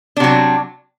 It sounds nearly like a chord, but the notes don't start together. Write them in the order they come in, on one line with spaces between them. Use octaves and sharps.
D4 C3 F#3